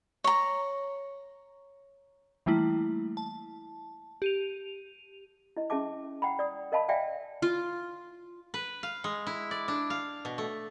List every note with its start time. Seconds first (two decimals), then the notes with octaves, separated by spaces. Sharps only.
0.24 C#5 A#5
2.46 E3 G3 A3 A#3 E4
3.17 A5
4.22 G4 D#7 F7
5.57 E4 D#5
5.70 C#4 G#4 E5 A5 D6
6.22 F#5 G5 A#5 B5
6.39 D5 D#6
6.72 A#4 D#5 F5 A5 B5
6.88 D5 E5 F5 G5 G#5
7.42 F4
8.54 B4
8.83 F5
9.04 G#3
9.27 E4
9.51 D5
9.68 D4
9.90 F5
10.25 B2
10.38 A3